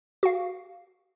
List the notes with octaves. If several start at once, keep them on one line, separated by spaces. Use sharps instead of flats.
F#4 F5